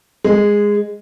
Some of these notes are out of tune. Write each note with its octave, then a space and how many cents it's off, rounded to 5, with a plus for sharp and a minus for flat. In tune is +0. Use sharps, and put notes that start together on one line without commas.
G#3 -10